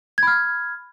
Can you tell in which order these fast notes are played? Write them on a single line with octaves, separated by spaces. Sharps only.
G#6 B5 F6